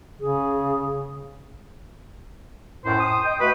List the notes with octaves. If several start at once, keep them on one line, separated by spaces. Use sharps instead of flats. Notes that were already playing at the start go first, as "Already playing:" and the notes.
C#3 G#4
F#2 A2 C5
D#6
D#5 G5
A3 F#4 B4